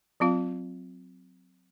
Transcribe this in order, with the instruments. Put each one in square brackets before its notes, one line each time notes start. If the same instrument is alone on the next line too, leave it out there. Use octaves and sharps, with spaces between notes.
[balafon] F#3 C4 F4 F5